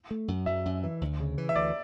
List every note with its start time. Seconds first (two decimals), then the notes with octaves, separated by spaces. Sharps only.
0.11 A3
0.28 F#2
0.46 F#2 E5
0.66 F#2
0.84 E3
1.01 D2
1.20 C#3
1.38 E3
1.49 E5
1.55 D2 D5